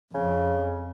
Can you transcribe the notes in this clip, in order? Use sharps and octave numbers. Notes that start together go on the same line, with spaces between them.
F2 C#3